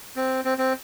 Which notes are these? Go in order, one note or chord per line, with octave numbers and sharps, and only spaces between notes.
C4
C4
C4